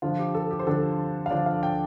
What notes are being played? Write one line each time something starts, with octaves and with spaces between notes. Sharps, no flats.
D3 F3 D4 F4
G4
A4
G4
C5
D3 F3 D4 A4
F5
D3 F3 D4 D5
F5
G5